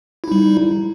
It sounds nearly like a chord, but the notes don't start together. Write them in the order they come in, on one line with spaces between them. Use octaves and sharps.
E4 D#4 G3